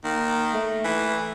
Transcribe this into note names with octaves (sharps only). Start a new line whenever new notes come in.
D#3 A#3
A3
E3